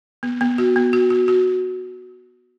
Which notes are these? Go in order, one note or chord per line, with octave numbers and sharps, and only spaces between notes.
B3
B3
F#4
B3
F#4
F#4
F#4